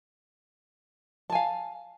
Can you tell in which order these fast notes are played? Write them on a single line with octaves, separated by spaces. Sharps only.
A5 G#5 F5